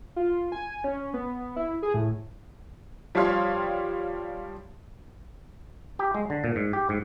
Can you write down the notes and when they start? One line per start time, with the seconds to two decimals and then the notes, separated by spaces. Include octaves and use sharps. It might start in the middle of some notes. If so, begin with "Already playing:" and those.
0.16 F4
0.52 G#5
0.84 C#4
1.14 B3
1.56 E4
1.82 G#4
1.94 A2
3.15 F3 G3 G4 C#5 F5 C6
5.99 G4
6.14 G#3
6.30 D3
6.44 A#2
6.56 G#2
6.73 G4
6.89 G#2